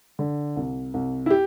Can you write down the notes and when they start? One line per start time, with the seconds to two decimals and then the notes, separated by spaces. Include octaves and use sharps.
0.19 D3
0.56 C2
0.94 C2
1.26 E4
1.30 G4